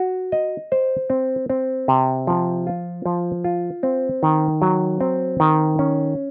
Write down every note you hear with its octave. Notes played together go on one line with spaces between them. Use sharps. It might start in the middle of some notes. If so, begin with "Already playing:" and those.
Already playing: F#4
D#5
C5
C4
C4
C3
F3
F4
F3
F4
C4
D#3
F#3
C4
D#3
C#4